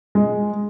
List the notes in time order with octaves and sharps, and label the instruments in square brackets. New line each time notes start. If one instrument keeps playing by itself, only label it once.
[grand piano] G#3